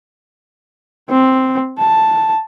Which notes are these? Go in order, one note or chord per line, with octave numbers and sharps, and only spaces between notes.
C4
A5